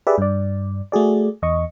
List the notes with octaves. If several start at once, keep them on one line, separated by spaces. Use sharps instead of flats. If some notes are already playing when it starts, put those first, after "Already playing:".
G4 G#4 B4 D5 E5
G2 D5
A3 F#4 G#4 D5
E2 D#5 C#6